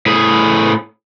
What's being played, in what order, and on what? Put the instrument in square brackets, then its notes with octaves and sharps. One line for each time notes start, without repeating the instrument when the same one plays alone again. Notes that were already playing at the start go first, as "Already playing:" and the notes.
[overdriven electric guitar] A2 G#4